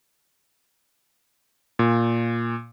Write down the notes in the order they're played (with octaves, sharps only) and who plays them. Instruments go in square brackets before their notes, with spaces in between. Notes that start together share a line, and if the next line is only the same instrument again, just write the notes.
[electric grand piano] A#2